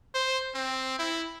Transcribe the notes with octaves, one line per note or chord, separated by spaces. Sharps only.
C5
C4
E4